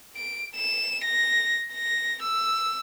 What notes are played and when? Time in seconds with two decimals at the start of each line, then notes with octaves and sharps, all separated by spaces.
0.16 D7
0.56 E7
1.05 A#6
1.74 A#6
2.22 E6